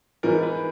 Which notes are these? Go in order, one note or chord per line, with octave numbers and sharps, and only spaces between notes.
G#2 E3 B3 A#4
B4